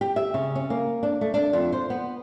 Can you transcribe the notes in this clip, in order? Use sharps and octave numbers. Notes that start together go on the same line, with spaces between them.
G4
E5
C#3
C#4
A#3
D4
A3
D4
F2
C5
B3